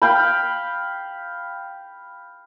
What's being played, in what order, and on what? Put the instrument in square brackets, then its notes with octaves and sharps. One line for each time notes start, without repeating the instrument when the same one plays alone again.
[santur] F5 G5 B5